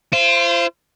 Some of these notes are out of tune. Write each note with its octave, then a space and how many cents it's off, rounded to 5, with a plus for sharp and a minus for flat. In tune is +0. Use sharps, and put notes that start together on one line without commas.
F4 -40 C5 +0